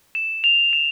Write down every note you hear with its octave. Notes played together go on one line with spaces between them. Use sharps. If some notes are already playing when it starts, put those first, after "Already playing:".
E7
F7
E7